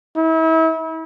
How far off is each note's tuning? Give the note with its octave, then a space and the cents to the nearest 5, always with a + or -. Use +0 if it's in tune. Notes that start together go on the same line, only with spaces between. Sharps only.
E4 -35